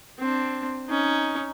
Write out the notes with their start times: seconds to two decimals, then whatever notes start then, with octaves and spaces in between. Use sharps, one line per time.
0.19 C4 D4
0.89 C#4 D#4